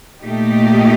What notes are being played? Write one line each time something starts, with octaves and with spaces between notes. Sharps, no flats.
A#2 A3 D#4 G4